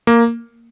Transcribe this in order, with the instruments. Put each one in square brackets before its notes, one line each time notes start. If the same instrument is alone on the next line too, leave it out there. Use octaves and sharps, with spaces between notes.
[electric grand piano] A#3